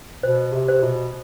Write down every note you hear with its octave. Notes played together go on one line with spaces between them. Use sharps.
B2 C5
C3
C5
B2